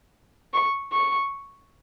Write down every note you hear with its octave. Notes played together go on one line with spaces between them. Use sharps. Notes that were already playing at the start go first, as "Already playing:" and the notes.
C#6
C#6